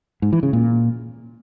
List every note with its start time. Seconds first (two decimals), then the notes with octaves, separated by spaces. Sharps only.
0.22 G#2
0.33 E3
0.43 C#3
0.53 A#2